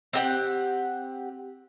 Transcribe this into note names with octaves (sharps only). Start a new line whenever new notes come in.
C4 G4 F#5